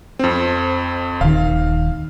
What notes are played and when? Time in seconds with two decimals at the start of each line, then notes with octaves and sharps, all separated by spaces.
0.19 F2 C4
1.21 D#1 D#3 F5